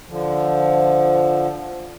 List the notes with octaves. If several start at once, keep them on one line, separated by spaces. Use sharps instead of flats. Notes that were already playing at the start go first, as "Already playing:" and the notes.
D3 F3